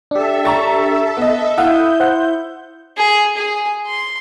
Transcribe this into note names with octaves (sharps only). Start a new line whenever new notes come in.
D4 G4 A4 E5
A#5 C#6 A6
B3 D#5
E4 F5 F#5 D#6 G6
C5 F#5
G#4
G#4
C6